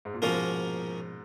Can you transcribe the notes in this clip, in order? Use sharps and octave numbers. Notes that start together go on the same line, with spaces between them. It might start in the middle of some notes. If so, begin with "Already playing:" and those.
G#2
A#2
G#2 B2 F3 A#3 C#4 F4 A#4